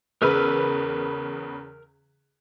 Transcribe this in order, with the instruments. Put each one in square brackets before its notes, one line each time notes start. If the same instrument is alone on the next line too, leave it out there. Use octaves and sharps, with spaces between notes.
[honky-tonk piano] E2 C#3 B4 [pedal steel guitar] A#4 E6 F6